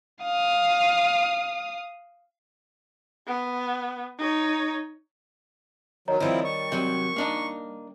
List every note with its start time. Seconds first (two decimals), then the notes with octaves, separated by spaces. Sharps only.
0.22 F5 D#6
3.27 B3
4.19 D#4 C#5
6.08 D#3 F#3 C#5 D#5 A#5
6.20 D#3 F3 G3 C4 E4
6.44 C#6
6.72 C3 F#3 G6
7.16 A#3 D4 D#4